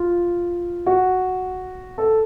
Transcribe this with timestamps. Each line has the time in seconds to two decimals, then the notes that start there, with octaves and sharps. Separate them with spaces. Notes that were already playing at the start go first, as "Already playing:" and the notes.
Already playing: F4
0.86 F#4
1.98 A4